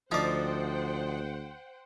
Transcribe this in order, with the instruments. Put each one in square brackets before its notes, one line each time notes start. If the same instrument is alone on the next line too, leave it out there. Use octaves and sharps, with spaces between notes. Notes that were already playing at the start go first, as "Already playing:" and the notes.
[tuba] D2 [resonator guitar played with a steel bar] F3 [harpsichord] D#4 D5 [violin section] C5 F#5 G5